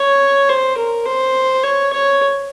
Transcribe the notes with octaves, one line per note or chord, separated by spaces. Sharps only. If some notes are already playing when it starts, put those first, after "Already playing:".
Already playing: C#5
C5
A#4
C5
C#5
C#5